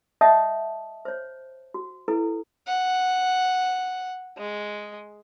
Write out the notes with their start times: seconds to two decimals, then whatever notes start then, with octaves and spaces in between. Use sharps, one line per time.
0.21 C#5 D#5 E5 F#5 A5 D#6
1.05 C5 C#5
1.74 F#4
2.08 E4 A4 B4
2.67 F#5
4.38 G#3